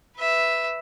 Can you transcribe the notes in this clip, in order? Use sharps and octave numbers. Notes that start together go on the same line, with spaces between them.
B4 E5